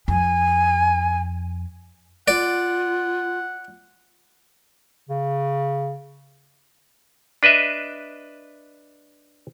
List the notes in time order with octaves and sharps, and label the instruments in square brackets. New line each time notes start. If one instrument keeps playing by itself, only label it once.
[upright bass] F2 [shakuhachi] G#5
[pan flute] F4 [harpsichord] D5 [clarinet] F#5
[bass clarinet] C#3
[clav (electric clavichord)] D4 B4 D#5 E5